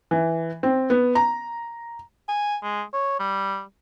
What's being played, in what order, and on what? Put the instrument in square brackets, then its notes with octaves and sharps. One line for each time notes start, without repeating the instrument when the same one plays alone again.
[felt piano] E3
C4
B3
A#5
[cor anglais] G#5
G#3
C#5
G3